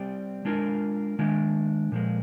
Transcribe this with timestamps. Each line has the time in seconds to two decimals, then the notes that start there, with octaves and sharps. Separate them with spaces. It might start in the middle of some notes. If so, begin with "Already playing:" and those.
Already playing: G3 C4 G4 D5
0.45 G#3 D4 F4 A#4
1.19 D#3 G#3 D4
1.92 A#2 F3 G#3